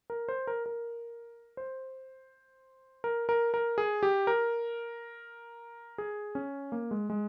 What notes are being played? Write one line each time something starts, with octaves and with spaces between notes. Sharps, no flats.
A#4
C5
A#4
A#4
C5
A#4
A#4
A#4
G#4
G4
A#4
G#4
C#4
A#3
G#3
G#3